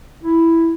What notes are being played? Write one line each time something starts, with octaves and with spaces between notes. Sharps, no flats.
E4